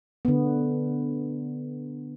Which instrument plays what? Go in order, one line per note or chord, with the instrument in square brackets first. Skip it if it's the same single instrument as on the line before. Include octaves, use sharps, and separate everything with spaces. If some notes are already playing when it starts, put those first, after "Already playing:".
[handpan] D3 B3